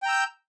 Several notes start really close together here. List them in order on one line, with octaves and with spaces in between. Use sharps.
G5 A#5 E6 G6